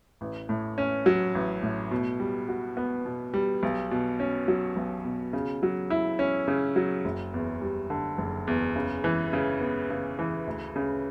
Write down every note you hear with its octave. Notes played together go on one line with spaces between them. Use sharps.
A1
A2
C#4
F#3
A1
A2
B2
G3
F#4
B3
B2
G3
B1
B2
C#4
F#3
B1
B2
C#3
F#3
E4
C#4
C#3
F#3
F#1
E2
G3
D3
F#1
E2
C#3
E3
C#3
B3
C#3
E3
D2
C#3